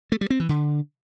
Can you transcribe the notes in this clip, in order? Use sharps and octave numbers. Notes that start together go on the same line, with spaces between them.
A3
G3
C4
E3
D3